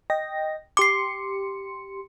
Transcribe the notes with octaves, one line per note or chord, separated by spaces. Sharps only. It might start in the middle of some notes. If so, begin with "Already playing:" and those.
D#5 G5 A#6
G4 C6 D6 C7 C#7